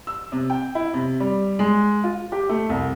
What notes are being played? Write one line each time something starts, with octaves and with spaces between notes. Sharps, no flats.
E6
C3
G5
E4
C3
G3
G#3
F4
G4
A3
C2